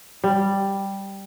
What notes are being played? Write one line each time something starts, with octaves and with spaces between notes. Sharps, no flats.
G3